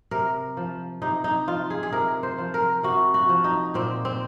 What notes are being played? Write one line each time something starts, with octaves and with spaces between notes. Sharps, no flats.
C3 A#4
F3
C3 D#4
D#4
F3 F4
G#4
G#4
C3 A#4
C5
F3
A#4
C3 F#4
F#4
F3
D#4
A#2 C4
C4